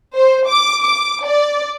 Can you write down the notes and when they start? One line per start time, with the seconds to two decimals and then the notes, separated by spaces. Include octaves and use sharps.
0.15 C5
0.47 D6
0.83 D6
1.24 D5